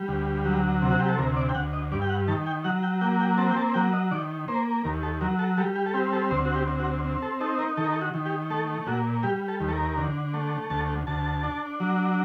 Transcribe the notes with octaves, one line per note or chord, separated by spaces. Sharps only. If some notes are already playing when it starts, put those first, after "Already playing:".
Already playing: G3
D2
F#3
C3
F#4
G4
A4
D2 A#4
D5
G5
D2 F#5
D#5
G2 D5
G5
F#5
D#3 A5
G5
F#3 F#5
G5
A#3 G5
G5
C4 A5
G5
A5
F#3 G5
D#5
D#3 D5
A#3 C5
D#2 A#4
A4
F#3 A#4
A4
G3 A4
G4
A4
C4 G4
A4
D2 C5
F#4
G4
C4
F#4
C4
A4
D#4 A4
A#4
D#3 A4
A#4
A4
F#4
D#3
G4
A3 A4
A#2 F#4
G3 G4
A4
D#2
A4
A#4
D3
A3
D2 A5
D2 A5
D4
F#3